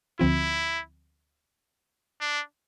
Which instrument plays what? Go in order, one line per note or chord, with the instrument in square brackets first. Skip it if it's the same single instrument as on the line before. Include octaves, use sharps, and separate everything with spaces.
[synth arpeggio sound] D2 D3 F3 C4 F4 [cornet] E4
[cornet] D4